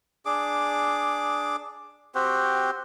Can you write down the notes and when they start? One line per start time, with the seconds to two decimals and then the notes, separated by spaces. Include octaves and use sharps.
0.26 D4 G#4 D6
2.15 C4 F#4 G4